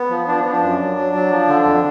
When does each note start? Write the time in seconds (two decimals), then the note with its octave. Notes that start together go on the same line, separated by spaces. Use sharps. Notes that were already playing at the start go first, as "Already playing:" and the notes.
Already playing: B3
0.10 F3
0.27 F3 D4
0.40 B3
0.45 F3
0.52 D4
0.62 F#2
0.79 F#3
0.96 F#3
1.14 F#3
1.31 F3
1.48 D3
1.65 F2